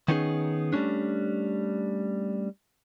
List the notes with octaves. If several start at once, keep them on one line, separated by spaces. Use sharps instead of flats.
D#3 B3 C#4 D#4 F#4 G#4
G3 A3 C#4 D4